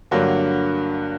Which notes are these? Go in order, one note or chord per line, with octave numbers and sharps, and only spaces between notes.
G2 D3 F#3 A#3